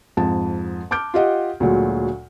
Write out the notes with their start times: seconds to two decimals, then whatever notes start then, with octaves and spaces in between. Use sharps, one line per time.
0.17 F2 G#2 A5
0.91 A5 D6 F6 G6 D7
1.14 F4 G4 D#5 F#5
1.60 D2 A#2 F#3 G#3